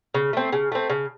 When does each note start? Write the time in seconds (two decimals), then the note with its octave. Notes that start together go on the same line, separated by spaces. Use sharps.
0.14 C#3
0.33 A3 C4
0.53 C#3
0.72 A3 C4
0.90 C#3